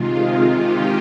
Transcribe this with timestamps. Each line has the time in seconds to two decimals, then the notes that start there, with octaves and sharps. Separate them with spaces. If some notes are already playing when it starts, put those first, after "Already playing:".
Already playing: C3 D#3 G#3 F4
0.61 D#4 G4